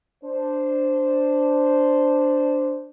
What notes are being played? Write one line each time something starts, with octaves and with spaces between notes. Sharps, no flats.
D4 C5